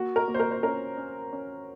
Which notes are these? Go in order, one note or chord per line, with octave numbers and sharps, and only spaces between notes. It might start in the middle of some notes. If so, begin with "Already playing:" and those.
Already playing: A#3 F#4
A#4
A#3
C5
A#4
C5
C#4 A#4
C#4
C#4